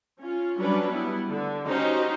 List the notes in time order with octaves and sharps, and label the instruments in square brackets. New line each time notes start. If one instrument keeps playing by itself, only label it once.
[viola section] C#4 F4
F#3 G3 C#4 D4 B4
G3 B3 E4
D3
C#4 D#4 F#4 G4 C5 D#5